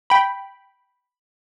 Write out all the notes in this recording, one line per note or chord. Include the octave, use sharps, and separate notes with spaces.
G5 B5